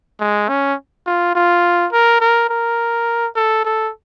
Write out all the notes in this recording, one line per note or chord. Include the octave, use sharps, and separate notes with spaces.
G#3
C#4
F4
F4
A#4
A#4
A#4
A4
A4